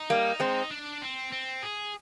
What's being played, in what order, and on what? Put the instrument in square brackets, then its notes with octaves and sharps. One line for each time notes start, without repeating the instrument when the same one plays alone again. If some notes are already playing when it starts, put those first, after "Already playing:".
Already playing: [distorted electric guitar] D#4
[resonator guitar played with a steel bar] G3 A#3
G#3 C4
[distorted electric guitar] D4
C4
C4
G#4